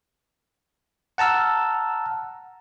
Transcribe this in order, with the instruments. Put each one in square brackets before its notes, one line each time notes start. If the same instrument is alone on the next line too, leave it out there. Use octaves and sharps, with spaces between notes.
[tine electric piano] F#5 A5 A#5 E6 F6